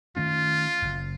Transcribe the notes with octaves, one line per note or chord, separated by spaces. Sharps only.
D#3 A3 C#4 F4
F#1 F#2